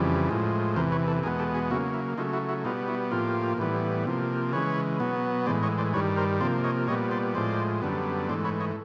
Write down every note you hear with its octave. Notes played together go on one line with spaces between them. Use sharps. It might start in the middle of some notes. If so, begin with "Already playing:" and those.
Already playing: F2 C#3 E3 G3
A2 F3 G#3
E2 C3 E3 A#4 C5
B4 C#5
A4 B4
E2 B2 G#3 B3 G#4 A#4
G4 A4
F#4 G#4
C#3 F#3 A#3 E4 F#4
E4
C#3 F#3 A3 D#4 F4
E4 F#4
E4 F#4
B2 G3 B3 D#4 F4
E4 F#4
A2 F3 A#3 F4 G4
A2 E3 G3 B3
C3 F3 A#3
C#3 E3 G#3 B4 C#5
B2 F#3 B3
A2 E3 G#3 C5 D5
C#5 D#5
C5 D5
G2 D#3 G3 B4 C#5
A#4 C5
C3 F3 A#3 C5 D5
C#5 D#5
A#2 G3 B3 C#5 D#5
C5 D5
A2 F3 G#3 C5 D5
F#2 D3 G3 B3
G#2 E3 A3 C5 D5
B4 C#5
C#5 D#5